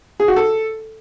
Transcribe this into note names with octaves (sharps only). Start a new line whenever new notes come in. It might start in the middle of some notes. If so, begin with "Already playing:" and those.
G#4
F#4
A4